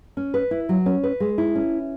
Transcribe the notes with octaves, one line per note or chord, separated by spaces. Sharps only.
C#4
B4
E4
F#3
C#4
B4
G#3
E4
C#4